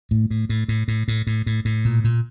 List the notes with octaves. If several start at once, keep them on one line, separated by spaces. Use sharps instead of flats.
A2
A2
A2
A2
A2
A2
A2
A2
A2
A#2
A#2